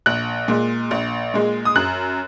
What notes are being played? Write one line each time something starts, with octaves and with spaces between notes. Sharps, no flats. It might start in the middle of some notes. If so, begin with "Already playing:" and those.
A#1 F#6
A#2 G#3
A#1
A#2 G#3
D#6
F#2 F#6